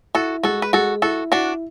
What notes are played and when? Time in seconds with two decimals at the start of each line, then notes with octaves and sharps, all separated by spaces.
0.15 E4 F#4 A4
0.43 G#3 F#4 A4
0.62 B4
0.73 G#3 F#4 A4
1.02 E4 F#4 A4
1.32 D4 E4 F#4